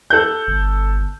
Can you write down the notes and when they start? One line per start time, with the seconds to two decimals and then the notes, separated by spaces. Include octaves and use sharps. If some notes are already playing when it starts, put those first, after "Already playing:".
0.10 A4 F#6 G6
0.47 G1